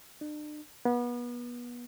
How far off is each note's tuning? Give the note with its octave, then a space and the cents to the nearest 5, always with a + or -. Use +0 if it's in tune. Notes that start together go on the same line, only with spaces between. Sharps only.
D4 +40
B3 -30